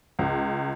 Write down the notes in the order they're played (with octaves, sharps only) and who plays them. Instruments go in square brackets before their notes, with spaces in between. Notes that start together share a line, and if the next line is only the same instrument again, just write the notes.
[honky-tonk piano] C#2